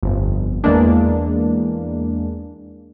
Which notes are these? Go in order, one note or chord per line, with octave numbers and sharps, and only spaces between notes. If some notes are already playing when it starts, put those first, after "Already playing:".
G1 F2
E2 E3 G#3 A#3 D4